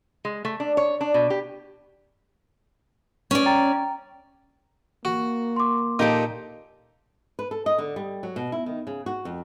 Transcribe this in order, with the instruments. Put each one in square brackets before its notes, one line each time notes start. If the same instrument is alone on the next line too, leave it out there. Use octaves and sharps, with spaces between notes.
[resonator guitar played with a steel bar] G#3
A3
D4
C#5
D4
B2
G4
[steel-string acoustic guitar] C#4 D5
[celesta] G5 A#5 A6
[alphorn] A#3 [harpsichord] F#4
[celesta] C6 D6
[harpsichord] A#2 [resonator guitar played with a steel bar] D#4 G4 A4
[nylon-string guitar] B4
A4
D#5
D3
G3
F#3
B2
E4
D#3
C#3
F#4
F2